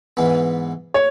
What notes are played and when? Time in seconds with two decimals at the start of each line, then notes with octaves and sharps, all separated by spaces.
0.17 G#2 E3 B3
0.94 C#5